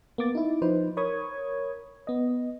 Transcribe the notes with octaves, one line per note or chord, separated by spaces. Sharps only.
A#3 B3 D6 A6
D#4 E4
F3 D#4 B4 C5
A#4 C#5 B5 C#6 D#6 G#6
B3 D#5